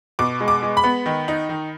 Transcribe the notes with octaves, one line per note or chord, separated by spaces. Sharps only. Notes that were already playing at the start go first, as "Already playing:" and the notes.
B2 D6
G#3
D6
G#3
B5
B3
D#3
D#4
D#3